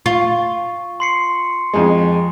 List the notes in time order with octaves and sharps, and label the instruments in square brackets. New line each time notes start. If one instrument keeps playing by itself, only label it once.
[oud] F4 [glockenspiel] C#6
[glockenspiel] C6 C7 C#7
[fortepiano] F2 G#3